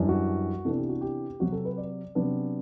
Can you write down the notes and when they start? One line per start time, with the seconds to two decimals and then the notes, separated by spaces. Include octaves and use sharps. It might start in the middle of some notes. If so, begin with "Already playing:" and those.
Already playing: F#2 E3 G3 D4
0.09 F#4
0.65 C3 E3 B3 D4 A4
0.78 G4
0.89 F#4
1.01 G4
1.40 C3 F#3 C4 F#4
1.52 A4
1.65 B4
1.77 D5
2.15 C3 F#3 B3 D4